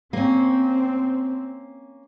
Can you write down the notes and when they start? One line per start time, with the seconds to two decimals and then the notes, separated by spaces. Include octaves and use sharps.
0.13 A#3 C4 C#4